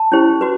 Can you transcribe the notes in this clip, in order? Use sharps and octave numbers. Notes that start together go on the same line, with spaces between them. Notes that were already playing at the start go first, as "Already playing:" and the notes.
Already playing: A5
C#4 E4 G4 C5
F#4 B4